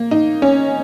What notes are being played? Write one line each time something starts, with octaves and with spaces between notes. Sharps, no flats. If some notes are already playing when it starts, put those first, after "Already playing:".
Already playing: A#3
D#4
C#4